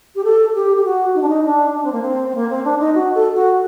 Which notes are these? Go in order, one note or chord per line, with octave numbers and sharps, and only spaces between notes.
G4
A4
G4
G4
F#4
D#4
D4
D#4
D4
D4
C4
A#3
C4
C4
A#3
C4
D4
D#4
F#4
A4
F#4